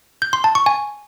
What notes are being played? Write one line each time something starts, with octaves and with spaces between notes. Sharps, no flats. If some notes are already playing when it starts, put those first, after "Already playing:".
G6
C6
A5
C#6
G#5